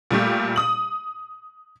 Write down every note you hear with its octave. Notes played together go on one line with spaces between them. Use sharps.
A#2 G3 A3 G4
D#6 F#7